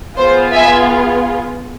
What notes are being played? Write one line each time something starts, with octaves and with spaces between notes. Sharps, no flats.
B3 F4 G#4 C5
E5 G#5